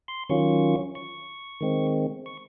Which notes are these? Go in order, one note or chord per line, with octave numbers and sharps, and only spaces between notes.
C6
D#3 F#3 C#4 F4 C#6
C#6
D#3 G#3 C4
C#6